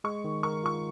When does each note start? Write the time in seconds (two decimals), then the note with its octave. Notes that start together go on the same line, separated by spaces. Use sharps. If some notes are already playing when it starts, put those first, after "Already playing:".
0.04 G#3 C#6
0.24 D#3
0.43 A#4 C#6
0.64 F4 C#6